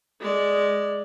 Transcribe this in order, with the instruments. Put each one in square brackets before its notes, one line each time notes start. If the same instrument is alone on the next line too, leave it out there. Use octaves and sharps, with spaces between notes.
[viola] G#3 D5